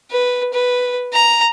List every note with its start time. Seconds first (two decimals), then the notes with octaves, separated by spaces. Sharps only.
0.11 B4
0.53 B4
1.13 A#5